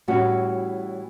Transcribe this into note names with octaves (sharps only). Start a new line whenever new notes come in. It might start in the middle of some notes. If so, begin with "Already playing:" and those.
A2 E3 G3 C#4 F#4